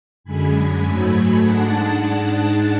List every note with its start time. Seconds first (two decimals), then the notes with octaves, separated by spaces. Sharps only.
0.24 F#2 D3 G#3 G#5 B5
0.82 G#2 F#3 A3 G#5 B5
1.12 G#5 B5
1.41 G#2 G#3 D4 F#5 A5